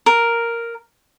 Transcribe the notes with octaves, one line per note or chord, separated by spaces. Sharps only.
A#4